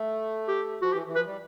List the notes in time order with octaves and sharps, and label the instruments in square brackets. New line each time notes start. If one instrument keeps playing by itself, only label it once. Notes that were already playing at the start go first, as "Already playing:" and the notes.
Already playing: [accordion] A3
[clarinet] G4
[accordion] F3 [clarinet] F#4
[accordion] E3 [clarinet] G4
[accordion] E3
[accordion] F3 [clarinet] B4
[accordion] G3